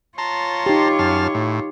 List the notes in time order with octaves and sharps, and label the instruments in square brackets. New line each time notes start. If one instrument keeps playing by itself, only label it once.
[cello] F4 C#5 [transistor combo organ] A5 A#5 C6
[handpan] D#4 G4
[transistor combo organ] F#2 A5 F6
A2